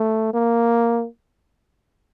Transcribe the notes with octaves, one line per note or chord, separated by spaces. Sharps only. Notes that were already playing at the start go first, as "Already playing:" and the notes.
Already playing: A3
A#3